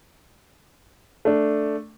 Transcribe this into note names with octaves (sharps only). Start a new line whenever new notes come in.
A3 D4